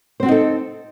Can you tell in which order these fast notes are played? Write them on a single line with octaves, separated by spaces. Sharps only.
C5 C4 F#4 D#4 A4